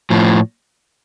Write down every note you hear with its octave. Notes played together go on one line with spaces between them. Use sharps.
A2 F3